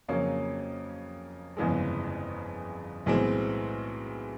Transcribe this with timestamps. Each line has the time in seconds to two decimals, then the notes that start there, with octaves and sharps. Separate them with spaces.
0.08 F2 C#3 F#3 A#3 C#4
1.57 G1 F2 C#3 E3 G#3
3.06 B1 A2 E3 G#3 C4